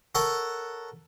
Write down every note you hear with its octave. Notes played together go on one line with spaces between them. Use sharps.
A4 A#4 C#5 F#5